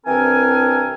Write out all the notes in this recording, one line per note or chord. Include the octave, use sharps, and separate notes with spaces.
C2 E3 C4 D4 A#4 G#5